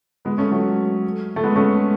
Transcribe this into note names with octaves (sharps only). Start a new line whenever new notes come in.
G#3 B3
A3 C#4
F#3 A3
A3
G#3 B3
A3 C#4